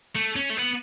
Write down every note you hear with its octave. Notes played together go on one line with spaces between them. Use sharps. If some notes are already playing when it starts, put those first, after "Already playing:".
A3
C#4
A3
B3